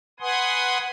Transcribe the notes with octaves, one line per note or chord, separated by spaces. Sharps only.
B4 F#5 G#5 C6 D#6